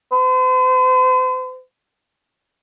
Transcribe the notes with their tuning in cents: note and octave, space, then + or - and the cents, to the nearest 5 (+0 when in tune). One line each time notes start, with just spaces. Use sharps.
C5 -45